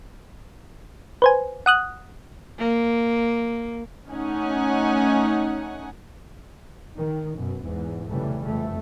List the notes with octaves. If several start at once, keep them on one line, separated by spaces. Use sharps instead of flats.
B4 C5 G#5
F#5 D#6 F#6
A#3
A3 C#4 D#4 F#5 G#5
D#3
F#2 B2
E2 G#2
F1 B1 C#3 E3 G3 A3
F1 F2 A3